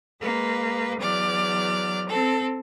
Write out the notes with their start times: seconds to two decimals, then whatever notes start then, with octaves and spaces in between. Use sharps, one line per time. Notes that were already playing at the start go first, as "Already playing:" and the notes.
0.19 G#3 A#3 B4
0.98 E2 F#3 D5 F6
2.08 C4 A4